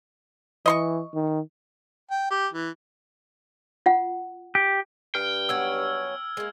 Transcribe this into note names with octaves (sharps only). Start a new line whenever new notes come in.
E3 D#5 C6 C#6
D#3
G5
G4
E3
F4 F#5
G4
G2 G5 F6
F#3 B3 C#4 E6 G#6
G#3 A#3